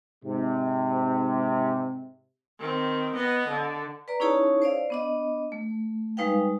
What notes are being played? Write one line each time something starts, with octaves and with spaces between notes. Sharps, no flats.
G#2 C3
D#3 C4
B3 D#5
D3
B4 D5 A#5
C#4 D#4 E4 G#4 C#5 A5
C5 D5 F5
B3 D4 D#5
A3
G3 G#3 D#4 B4 F5 G5